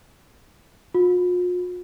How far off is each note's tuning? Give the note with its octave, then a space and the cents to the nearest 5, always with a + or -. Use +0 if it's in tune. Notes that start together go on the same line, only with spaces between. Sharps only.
F4 +45